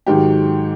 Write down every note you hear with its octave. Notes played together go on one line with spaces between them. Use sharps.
G#2 D#3 F#3 G4